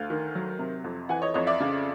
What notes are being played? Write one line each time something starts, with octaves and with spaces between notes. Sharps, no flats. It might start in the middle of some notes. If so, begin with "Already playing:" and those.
Already playing: D2 F5
D#3
F#3
C3
F2
E3 F#5 G#5
C#5 D#5
F2 C#5 D#5
D5 E5
C#3